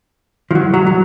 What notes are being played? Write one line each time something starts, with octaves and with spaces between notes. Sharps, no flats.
F3
F#3
F#3
F#3